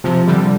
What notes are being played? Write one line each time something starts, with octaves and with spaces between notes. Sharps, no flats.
C3 F3
D3 G3